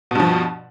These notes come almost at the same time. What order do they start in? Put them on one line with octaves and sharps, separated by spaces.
B2 G2 F3